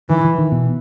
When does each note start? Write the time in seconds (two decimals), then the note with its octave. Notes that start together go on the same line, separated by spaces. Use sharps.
0.09 D#3 E3
0.25 E3
0.38 D#3
0.52 B2